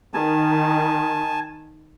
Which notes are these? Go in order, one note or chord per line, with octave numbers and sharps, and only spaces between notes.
D#3 G#5 A5